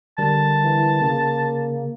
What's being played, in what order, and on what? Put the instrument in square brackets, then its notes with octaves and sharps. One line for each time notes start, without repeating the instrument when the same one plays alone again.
[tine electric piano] D3 G3 A#4 [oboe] A5
[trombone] E3
[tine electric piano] C#3 [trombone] A#3